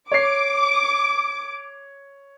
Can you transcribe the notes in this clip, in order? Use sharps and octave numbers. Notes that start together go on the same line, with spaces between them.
C#5 D6 C7